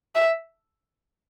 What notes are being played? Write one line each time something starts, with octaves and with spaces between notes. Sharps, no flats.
E5